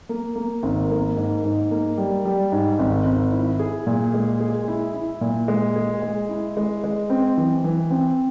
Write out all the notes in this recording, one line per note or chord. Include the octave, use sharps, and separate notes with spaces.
A#3
A#3
G#1
A#3
G#2
G#2
A#3
G3
G3
G#2
G#1
G#1
E4
G#4
A#2
G#3
G#4
E4
E4
A#2
G#3
G#4
G#3
E4
G#3
G#3
C4
E3
E3
C4